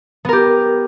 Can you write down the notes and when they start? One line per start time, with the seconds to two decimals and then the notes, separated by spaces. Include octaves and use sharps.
0.25 B3
0.29 A#4
0.33 G4